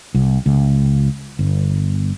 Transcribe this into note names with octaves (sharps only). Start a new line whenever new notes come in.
C2
C#2
G1